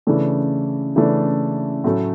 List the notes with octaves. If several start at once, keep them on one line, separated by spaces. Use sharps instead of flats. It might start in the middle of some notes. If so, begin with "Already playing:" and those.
C#3 E3 A3 D4
C#3 E3 A3 D4
A2 F#3 A3 C#4